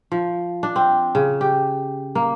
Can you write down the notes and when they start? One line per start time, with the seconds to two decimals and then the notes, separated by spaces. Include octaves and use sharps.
0.12 F3
0.63 D4
0.76 C4
1.15 C#3
1.41 G4
2.15 A#3